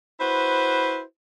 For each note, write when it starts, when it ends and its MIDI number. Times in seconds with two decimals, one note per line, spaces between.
0.20 1.02 64
0.20 1.02 66
0.20 1.02 71
0.20 1.02 72